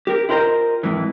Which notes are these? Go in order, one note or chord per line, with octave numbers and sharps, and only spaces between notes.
G4 A#4
E4 F4 G4 A#4 C5 D#5
F2 G#2 E3